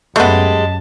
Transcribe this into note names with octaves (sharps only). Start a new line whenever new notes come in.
F#2 G#3 A3 B3 G4 A5